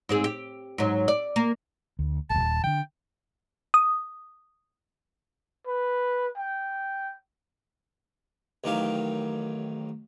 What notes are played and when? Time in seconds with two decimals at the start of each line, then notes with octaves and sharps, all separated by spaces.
0.09 G#2 C4 G#4
0.24 G4
0.78 G#2 F#3
1.08 D5
1.36 A#3
1.99 D2
2.30 D#1 G#1 A5
2.64 D3 D#3 G5
3.74 D#6
5.67 B4
6.38 G5
8.64 A1 D#3 F#3 G4 F5